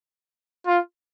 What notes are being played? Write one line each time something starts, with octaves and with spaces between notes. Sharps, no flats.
F4